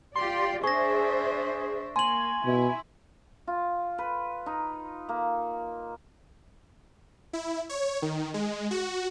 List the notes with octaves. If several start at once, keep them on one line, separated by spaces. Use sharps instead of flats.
F4 G4 D5 C6
D4 G#4 C5 E5 C#6 A#6
A#3 G#5 C6 F#7
B2 E4
F4
B4
D#4
A#3
E4
C#5
D#3
G#3
F#4